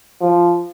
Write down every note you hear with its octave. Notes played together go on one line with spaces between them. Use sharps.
F3